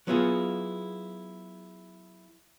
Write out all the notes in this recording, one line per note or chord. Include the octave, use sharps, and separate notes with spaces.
F#3 B3 E4 F4 G#4